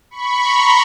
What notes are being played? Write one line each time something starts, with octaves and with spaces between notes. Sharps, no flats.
B5 C#6
A#5 C6